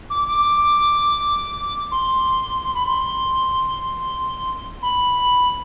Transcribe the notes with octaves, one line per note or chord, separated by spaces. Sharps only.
D6
D6
C6
C6
B5
C6
B5